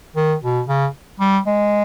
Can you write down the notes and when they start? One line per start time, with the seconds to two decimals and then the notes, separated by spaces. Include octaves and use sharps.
0.16 D#3
0.43 B2
0.68 C#3
1.20 G3
1.47 G#3